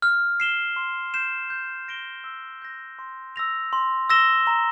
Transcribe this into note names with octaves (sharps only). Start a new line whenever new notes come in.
F6
C7 E7 G7
C6
G6 C7 E7
G6
A#6 D7 G7
E6
G6 A#6
C6
E6 A#6 F7
C6
E6 A#6 E7 G7
A#5